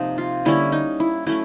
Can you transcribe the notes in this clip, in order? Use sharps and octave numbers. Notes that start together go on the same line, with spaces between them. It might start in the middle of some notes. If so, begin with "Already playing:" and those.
Already playing: C3 F3 A#3 D#4
F4
D3 G3 A#3 C#4 E4
D#4
E4
F#3 A3 C#4 E4